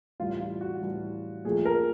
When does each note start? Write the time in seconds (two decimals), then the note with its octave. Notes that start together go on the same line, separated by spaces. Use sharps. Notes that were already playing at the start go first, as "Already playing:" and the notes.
0.20 A2 E3 G3 F4
0.41 F4
0.61 F#4
0.82 A2 E3 G3
1.45 A#2 F3 A3 G#4
1.65 A#4